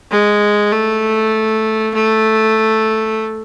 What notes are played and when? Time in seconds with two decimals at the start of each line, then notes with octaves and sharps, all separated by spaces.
0.11 G#3
0.72 A3
1.94 A3